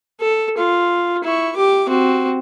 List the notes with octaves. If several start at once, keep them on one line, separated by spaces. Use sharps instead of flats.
A4
F4
E4 C#6
G4 D6
C4 F#4